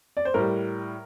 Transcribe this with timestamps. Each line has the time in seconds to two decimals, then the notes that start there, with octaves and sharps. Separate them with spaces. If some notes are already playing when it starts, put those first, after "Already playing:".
0.17 D5
0.25 C5
0.34 A2 G3 A#4